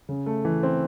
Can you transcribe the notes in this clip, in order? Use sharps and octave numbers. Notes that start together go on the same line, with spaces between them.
C#3
A3
E3
C4